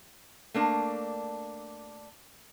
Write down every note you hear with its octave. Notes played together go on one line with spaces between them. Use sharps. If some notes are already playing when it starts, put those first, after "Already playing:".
A3 A#3 D4